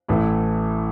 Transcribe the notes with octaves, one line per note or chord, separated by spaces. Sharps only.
A1 A2 E3 A3 E4